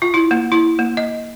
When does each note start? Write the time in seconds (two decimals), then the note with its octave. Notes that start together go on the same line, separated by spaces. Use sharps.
0.02 F4
0.14 E4
0.31 A#3
0.52 E4
0.79 A#3
0.97 D#5